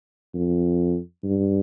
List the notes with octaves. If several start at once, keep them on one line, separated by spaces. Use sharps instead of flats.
F2
G2